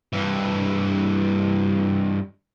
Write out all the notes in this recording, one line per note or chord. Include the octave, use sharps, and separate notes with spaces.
G2 E3